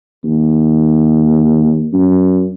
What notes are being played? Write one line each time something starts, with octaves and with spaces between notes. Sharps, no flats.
D#2
F#2